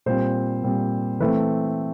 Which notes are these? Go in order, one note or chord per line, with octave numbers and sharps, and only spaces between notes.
A#2 G3 C4 C5
A#2 G3 C4
E3 A3 C4 B4